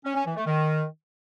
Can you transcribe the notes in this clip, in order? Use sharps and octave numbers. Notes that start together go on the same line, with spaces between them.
C#4
C#4
E3
A3
D#3